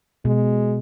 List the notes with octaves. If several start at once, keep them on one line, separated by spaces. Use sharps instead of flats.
B2 G#3